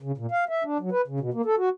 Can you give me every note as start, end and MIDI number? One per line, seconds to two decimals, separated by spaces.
0.02 0.12 49
0.18 0.26 46
0.31 0.44 77
0.49 0.63 76
0.64 0.78 62
0.80 0.90 54
0.92 1.01 71
1.08 1.19 49
1.20 1.30 47
1.34 1.42 58
1.46 1.55 69
1.58 1.69 66